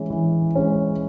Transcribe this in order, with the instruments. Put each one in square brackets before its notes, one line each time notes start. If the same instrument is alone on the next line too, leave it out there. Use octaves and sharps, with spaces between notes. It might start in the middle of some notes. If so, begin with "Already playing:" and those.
Already playing: [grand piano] E3 G#3 C#4
E3
G#3 C#4